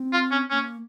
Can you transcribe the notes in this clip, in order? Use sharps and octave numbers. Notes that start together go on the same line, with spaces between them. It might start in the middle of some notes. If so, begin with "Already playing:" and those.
Already playing: C4
F4
C#4
A#3 C#4